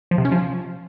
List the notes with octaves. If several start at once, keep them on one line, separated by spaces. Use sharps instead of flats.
F3
C3
C#4
F3